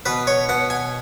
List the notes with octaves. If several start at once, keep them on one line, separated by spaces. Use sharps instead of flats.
B2 B4
C#5
B2 F#5
G#5